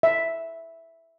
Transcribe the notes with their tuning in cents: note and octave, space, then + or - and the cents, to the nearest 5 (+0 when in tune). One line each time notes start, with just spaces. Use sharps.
E5 +0